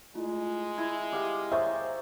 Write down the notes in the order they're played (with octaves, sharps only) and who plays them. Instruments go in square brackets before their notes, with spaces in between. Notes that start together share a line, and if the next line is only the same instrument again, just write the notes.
[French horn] G#3 [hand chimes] A3 E4 F4
[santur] E4 [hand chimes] G#6
[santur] G4 D5 F5
[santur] C5 C#5 D#5 [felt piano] E5 [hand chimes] A#5 G6 A6